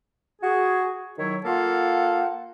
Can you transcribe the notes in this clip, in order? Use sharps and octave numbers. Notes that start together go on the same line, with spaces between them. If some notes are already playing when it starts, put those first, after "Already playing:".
F#4 G#4
D#3 F#3 E4 C#5
A#3 F4 A4 F5 F#5